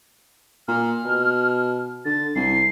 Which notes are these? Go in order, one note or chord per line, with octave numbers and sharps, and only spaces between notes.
A#2 F6
B2
D3 A6
C2 C7